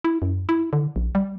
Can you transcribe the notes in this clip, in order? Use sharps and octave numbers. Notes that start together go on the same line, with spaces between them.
E4
F#2
E4
D3
A#1
G3